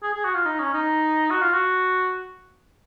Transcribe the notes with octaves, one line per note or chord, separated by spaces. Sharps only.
G#4
G#4
F#4
F4
D#4
C#4
D#4
F#4
F4
F#4